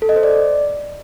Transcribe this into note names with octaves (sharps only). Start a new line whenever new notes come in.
A4
D#5
C5
D5